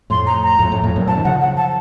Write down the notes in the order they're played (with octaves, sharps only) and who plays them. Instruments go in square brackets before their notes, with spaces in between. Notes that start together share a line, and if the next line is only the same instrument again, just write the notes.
[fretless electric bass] F2 A2 [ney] C6
[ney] A#5
A#5
[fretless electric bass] F2 A2
F2 A2
F2 A2
F#2 A#2
[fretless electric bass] F3 [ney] A5
[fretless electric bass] D#3
[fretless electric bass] C#3 F3 [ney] F#5
[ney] F#5
A5